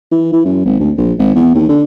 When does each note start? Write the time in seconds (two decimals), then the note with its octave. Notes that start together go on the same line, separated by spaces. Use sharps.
0.12 E3
0.33 E3
0.45 F#2
0.65 G#1
0.80 D2
0.98 A#1
1.19 G#1
1.35 E2
1.54 D#2
1.69 D3